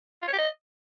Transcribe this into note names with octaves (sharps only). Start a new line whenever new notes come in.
F4
C#5
G4
D#5